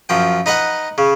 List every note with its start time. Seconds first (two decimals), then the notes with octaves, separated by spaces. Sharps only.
0.09 F#2 F3 G5
0.46 D#4 B4 D#5 F#5
0.98 C#3